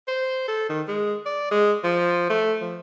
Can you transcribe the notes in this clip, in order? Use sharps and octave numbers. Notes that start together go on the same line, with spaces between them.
C5
A4
D#3
G#3
D5
G#3
F3
A3
F3